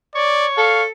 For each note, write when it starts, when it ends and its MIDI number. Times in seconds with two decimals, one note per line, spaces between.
0.15 0.83 73
0.15 0.46 74
0.57 0.90 69
0.57 0.83 77